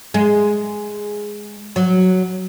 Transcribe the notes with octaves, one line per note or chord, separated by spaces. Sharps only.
G#3
F#3